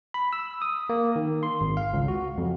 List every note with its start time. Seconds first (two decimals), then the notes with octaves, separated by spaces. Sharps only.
0.14 B5
0.33 E6
0.62 D#6
0.89 A#3
1.16 D#3
1.43 C6
1.61 G#1
1.77 F5
1.93 C#2
2.08 F#4
2.38 F2